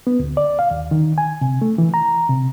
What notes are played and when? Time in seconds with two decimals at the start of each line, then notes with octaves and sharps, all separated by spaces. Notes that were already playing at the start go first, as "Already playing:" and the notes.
0.07 B3
0.20 D2
0.37 D5
0.59 F5
0.71 D#2
0.91 D#3
1.18 G#5
1.41 C3
1.62 A3
1.78 E3
1.94 A#5
2.29 C3